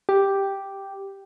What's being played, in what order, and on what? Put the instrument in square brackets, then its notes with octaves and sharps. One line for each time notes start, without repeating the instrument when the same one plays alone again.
[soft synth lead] G4